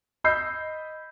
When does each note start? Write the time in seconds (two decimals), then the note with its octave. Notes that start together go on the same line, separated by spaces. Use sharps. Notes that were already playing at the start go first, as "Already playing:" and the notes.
0.24 D#5 B5 E6 G6 C7